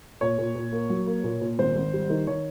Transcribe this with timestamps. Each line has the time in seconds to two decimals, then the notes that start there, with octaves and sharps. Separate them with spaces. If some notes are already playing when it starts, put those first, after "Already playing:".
0.21 A#2 C#5
0.38 A#2
0.55 A#2
0.72 A#3
0.90 F#3
1.07 A#3
1.24 A#2
1.41 A#2
1.59 G#1 C5
1.76 G#1
1.93 G3
2.10 D#3
2.27 D#3 C#5